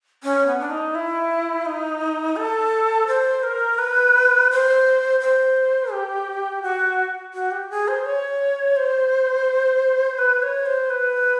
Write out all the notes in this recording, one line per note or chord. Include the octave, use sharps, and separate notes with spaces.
C#4
B3
D4
D#4
E4
D#4
A4
C5
A#4
B4
C5
C5
G4
F#4
F#4
G4
G#4
C5
C#5
C5
B4
C#5
C5
B4